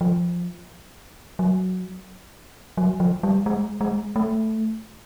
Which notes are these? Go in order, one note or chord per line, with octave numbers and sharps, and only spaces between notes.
F3
F#3
F#3
F3
G3
G#3
G#3
A3